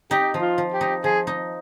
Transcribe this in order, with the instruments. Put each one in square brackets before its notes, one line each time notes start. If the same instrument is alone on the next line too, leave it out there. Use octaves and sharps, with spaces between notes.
[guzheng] D#4 [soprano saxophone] G4
[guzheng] F3
[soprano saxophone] F4
[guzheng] F3
[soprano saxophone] G4
[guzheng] D#4
[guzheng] F3 [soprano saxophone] G#4
[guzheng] D#4